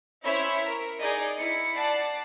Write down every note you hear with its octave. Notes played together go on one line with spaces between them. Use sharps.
C#4 E4 C5 C#5 E5 B5
A#4
D#4 G#4 D5 D#5
E4 C#7
D5 F#5 A5 C7